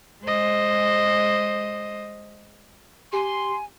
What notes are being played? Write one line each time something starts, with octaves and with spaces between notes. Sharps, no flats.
G#3 C5 D#5
G4 G#5 C6